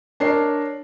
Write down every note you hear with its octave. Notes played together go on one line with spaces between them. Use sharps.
D4 A#4 C#5 D#5 C7